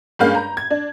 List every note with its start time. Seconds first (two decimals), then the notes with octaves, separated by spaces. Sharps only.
0.19 G2 G#3 A#3 C#4 F5 G6
0.35 A#5
0.57 G#6
0.71 D4